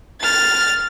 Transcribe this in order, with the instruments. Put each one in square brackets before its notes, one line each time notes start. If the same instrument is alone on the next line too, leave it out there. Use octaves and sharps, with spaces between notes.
[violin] F6 A6